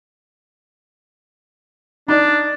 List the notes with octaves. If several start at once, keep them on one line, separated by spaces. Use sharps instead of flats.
D4 D#4 D5